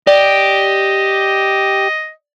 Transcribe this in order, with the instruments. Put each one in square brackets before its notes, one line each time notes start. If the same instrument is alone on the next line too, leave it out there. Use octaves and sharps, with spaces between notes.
[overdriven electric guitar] G4 [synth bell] D5 [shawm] D#5